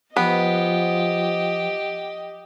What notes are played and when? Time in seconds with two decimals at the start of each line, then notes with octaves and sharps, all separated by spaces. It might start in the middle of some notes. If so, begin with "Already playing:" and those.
0.17 F3 B3 G4 D#5